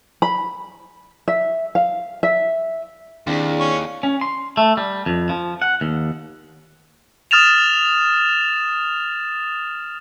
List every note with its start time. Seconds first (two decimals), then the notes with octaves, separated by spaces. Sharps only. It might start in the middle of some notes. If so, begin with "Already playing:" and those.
0.22 B5
1.28 E5
1.75 F5
2.23 E5
3.27 D#2 D#3 C4 D4 E4 G#4 D5
3.60 C#4 C#6
4.03 C#4
4.21 C6
4.57 A3
4.77 G3
5.06 F2
5.29 F3
5.62 F#5
5.81 D#2
7.31 D#6 F6 A6 E7 F7